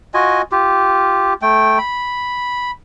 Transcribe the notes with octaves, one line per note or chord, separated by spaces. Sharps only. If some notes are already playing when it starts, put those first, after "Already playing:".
F4 F#4 D#5 G#5
F4 G4
A3 G5
B5